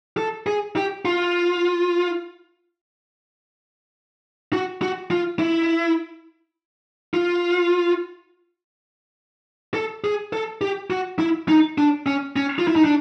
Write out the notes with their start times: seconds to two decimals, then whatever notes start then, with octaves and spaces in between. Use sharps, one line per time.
0.17 A4
0.47 G#4
0.76 G4
1.05 F4
4.53 F#4
4.82 F#4
5.11 F4
5.39 E4
7.14 F4
9.74 A4
10.04 G#4
10.33 A4
10.61 G4
10.90 F#4
11.19 E4
11.48 D#4
11.78 D4
12.06 C#4
12.36 C#4
12.59 F4
12.67 E4
12.76 D#4
12.85 D4